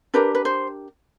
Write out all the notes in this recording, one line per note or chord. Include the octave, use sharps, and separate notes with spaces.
D4 G4 A#4 B4
B4
C5